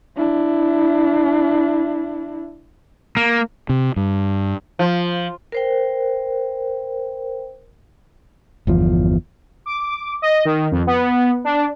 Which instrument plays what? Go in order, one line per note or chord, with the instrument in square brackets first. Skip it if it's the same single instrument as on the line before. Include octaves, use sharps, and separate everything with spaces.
[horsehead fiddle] D4 E4
[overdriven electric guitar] A#3
[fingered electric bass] C3
G2
[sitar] F3
[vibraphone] A#4 C5 G5
[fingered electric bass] G1 E2 F3
[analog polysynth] D6
D#5
D#3
F2
B3
D4